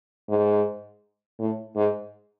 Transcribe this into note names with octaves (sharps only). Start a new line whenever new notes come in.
G#2
A2
G#2